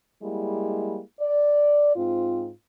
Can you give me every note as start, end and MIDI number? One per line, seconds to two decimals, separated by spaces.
0.22 1.00 55
0.22 1.00 56
0.22 1.00 58
0.22 1.00 64
1.20 1.94 74
1.95 2.50 44
1.95 2.50 60
1.95 2.50 65